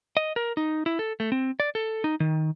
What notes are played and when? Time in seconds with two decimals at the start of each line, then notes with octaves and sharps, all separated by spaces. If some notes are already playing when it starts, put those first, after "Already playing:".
0.17 D#5
0.36 A#4
0.57 D#4
0.86 E4
0.99 A4
1.20 A3
1.32 C4
1.60 D5
1.75 A4
2.04 D#4
2.20 D#3